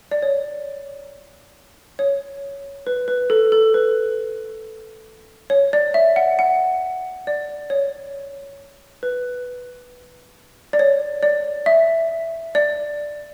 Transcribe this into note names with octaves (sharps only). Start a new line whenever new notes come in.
D5
C#5
C#5
B4
B4
A4
A4
B4
C#5
D5
E5
F#5
F#5
D5
C#5
B4
D5
C#5
D5
E5
D5